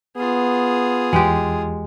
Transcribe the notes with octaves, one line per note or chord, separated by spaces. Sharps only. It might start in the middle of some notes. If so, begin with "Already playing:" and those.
B3 F4 G#4
E2 G#3 G4